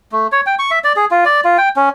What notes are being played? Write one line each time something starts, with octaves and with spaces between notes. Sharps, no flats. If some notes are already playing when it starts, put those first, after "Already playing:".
A3
C#5
G5
C#6
E5
D5
G#4
F4
D5
F4
G5
C#4